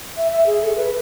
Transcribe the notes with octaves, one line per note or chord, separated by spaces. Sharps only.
E5
E5
G#4
A4
B4